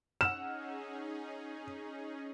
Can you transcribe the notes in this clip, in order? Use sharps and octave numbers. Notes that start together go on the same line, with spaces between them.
C#4 D#4 G#4 F#5 E6 F6 E7